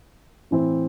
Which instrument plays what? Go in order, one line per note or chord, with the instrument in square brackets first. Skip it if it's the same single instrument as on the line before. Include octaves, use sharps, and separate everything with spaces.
[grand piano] A2 E3 C4